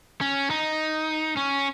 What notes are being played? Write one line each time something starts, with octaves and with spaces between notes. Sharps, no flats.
C#4
D#4
C#4